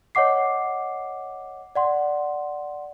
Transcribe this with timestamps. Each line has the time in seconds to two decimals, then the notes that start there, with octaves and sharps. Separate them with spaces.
0.15 C#5 D#5 F#5 D6 C7
1.75 D5 F#5 C6